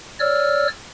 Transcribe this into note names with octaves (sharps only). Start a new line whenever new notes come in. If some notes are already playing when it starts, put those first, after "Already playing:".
C#5 D5 E6 F6